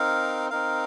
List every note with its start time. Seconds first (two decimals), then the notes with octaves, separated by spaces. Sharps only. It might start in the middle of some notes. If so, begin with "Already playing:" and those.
Already playing: C4 D#4 A#4 F5
0.50 C4 D#4 A#4 F5